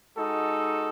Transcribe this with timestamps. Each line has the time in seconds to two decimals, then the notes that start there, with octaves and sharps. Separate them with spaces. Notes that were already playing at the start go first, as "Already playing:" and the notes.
0.18 G#3 D#4 F#4 A4